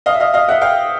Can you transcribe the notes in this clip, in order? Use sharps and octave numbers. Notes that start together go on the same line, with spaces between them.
D#5 F5
E5
D#5 F5
D#5 F5
E5 F#5
F5 G5